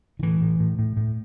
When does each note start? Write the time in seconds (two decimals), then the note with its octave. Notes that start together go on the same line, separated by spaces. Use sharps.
0.19 D#3
0.23 A2 E3
0.41 A2
0.60 A2
0.79 A2
0.97 A2